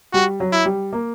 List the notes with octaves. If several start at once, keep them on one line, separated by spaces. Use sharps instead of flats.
G3 F#4
F#3
E4
G3
A#3